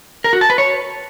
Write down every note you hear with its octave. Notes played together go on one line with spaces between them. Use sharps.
A#4
F#4
A5
B4
C#5